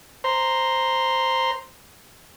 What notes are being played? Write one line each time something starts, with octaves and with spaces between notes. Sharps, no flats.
C5 A#5 C6